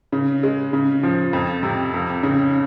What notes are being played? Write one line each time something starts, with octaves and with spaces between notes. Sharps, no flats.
C#3
G#3
C#3
F3
F2
C3
F2
C#3